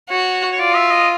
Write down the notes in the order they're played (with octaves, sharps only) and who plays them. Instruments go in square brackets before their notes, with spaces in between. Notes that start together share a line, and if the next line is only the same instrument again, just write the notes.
[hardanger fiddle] F#4 [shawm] C#5
[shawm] C#5
[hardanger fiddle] F4 [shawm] D5
[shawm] E5
D#5